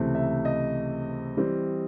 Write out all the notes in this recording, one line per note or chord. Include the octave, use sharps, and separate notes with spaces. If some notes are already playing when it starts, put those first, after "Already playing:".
Already playing: C#2 C3 E3 A3 C4
E5
D#5
E3 G3 C4